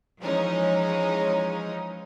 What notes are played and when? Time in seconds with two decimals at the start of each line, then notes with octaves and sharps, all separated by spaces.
0.21 E3 F3 G#3 C#4 D#4